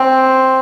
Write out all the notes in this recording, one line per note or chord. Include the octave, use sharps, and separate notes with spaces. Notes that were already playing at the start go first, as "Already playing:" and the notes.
Already playing: C4